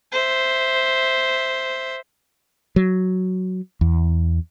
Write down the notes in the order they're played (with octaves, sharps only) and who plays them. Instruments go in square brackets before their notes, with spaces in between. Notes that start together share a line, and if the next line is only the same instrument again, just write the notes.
[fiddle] C5 E5
[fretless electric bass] F#3
E2